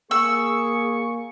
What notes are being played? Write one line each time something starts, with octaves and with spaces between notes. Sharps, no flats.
A#3 G#4 C#6 E6